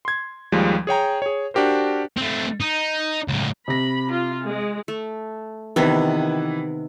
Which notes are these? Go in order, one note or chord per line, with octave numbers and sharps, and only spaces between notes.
C6 G#6
D#2 F3 G3 G#3
G#4 C#5 G5 A#5
G#4 C#5
D4 F#4 G4 A#4 C5
A3 C4
D#4
C#2 A2
C3 B5 A#6
F4
G#3
A3
C3 D#3 E3 B3 E4 B4